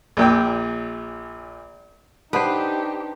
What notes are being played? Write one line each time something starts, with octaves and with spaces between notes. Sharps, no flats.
A#1 A#2 G5
D4 D#4 G4 A4 B4 C5 F#5